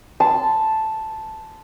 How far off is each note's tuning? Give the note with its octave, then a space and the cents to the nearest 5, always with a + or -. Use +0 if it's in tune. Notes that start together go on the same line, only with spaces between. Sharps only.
A5 -5 C6 -30